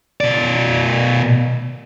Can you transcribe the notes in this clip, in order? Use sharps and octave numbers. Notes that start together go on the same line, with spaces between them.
B2 D5